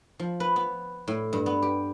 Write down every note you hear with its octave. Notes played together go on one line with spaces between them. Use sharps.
F3
B4
B3
A2
G2
B3
G4